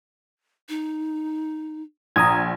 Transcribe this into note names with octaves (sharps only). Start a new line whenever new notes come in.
D#4
A#1 A#5 D#6 G#6